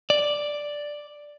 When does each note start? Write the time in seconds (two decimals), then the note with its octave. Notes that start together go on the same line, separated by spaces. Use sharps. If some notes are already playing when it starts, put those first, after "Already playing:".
0.10 D5